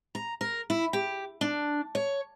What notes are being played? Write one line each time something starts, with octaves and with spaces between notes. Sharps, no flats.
A#5
A#4
E4
G4
D4
C#5